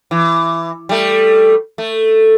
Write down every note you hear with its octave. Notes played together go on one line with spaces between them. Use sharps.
E3
G3 A3
A3